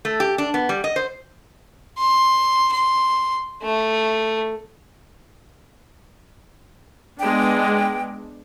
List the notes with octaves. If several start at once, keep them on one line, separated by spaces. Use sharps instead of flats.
A3
G4
D4
B3
G3
D#5
C5
C6
C6
A3
G#3 B3 D4 G5